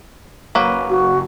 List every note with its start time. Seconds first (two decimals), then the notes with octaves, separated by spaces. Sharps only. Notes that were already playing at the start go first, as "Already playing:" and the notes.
0.55 F#1 F#3 A#3 B4
0.90 F#4